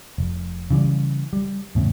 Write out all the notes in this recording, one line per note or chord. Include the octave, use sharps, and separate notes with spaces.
F1
C#3 E3 F#3 G3
G3
E2 A2 C#3